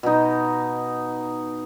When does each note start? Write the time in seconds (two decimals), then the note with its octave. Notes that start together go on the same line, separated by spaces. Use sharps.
0.03 B2 D#4